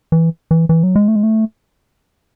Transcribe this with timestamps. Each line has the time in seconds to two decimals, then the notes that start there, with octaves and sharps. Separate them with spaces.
0.12 E3
0.51 E3
0.69 E3
0.83 F#3
0.96 G#3
1.08 A3
1.16 G#3
1.23 A3